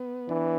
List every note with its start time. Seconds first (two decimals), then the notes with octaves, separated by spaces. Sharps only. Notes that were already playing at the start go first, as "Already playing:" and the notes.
Already playing: B3
0.28 E3 D4